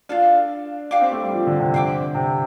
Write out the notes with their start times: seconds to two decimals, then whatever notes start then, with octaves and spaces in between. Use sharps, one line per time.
0.09 D4 F4 A4 F5
0.91 D4 G4 F5 D6
1.01 C4
1.11 A3
1.23 G3
1.32 F3
1.47 D3
1.60 C3
1.74 D3 C5 G5 D6
2.15 C3